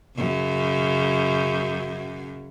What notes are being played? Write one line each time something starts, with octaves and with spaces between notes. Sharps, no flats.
F#2 C#3